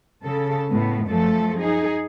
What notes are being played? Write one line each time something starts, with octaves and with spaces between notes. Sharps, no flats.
C#3 A4
A2 B3
F#2 F3 A3 A4
D#4 G#4